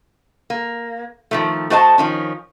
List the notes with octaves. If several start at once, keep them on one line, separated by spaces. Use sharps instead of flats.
A#3
D#3 F3 A3
A3 F#4 C5 D#5 G5 A5
D#3 F3 C#4